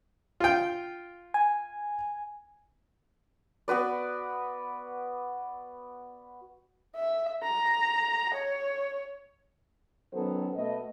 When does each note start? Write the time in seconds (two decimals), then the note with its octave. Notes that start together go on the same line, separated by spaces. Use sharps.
0.40 F4 G5
1.34 G#5
3.68 B3 F#4 B4 D5
6.96 E5
7.43 A#5
8.34 C#5
10.13 D#3 F#3 B3 C#4 A4 C5
10.56 B2 A3 D#5